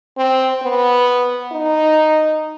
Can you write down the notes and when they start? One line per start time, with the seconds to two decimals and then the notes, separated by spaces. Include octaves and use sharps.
0.17 C4
0.62 B3
1.52 D#4